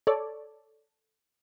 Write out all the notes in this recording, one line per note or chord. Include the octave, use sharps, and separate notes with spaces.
A4 C#5 D5